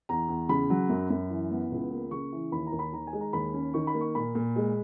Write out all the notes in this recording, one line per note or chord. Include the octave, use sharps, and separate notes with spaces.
E2 A#5
E2
C#3 B5
F#3
F#2
F#2
E3
B3
C#2
A#3
C#3 C#6
E3
D#2 B5
A#5
D#2
B5
D#3 A#5
G#5
G#3
A#5
D#2 B5
C#4
D#3 C#6
B5
A#3
C#6
A#2 B5
A#2
G#3